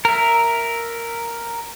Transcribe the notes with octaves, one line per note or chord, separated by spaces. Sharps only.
A#4 E5